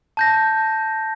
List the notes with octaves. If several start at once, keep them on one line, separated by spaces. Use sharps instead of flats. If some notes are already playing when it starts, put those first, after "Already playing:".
A5 G6 A#6